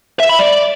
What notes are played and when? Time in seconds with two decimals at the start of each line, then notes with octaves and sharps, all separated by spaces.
0.20 E5
0.29 B5
0.39 D5